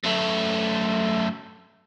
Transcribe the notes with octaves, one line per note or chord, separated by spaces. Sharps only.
F#2 A3